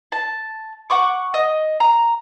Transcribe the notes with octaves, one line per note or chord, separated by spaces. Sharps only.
A5
F#5 C#6 D6
D#5
A#5